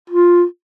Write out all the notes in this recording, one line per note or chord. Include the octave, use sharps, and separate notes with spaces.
F4